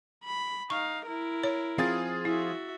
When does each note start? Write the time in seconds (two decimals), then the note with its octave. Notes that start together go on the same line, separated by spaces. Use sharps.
0.24 B5
0.70 D#4 F5 C#6
1.06 E4 A#4
1.44 C#5
1.78 F3 C4 F4 G#4 A6
2.25 E4 F#4 E5